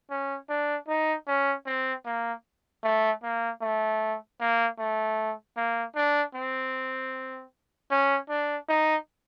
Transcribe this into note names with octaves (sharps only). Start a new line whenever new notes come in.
C#4
D4
D#4
C#4
C4
A#3
A3
A#3
A3
A#3
A3
A#3
D4
C4
C#4
D4
D#4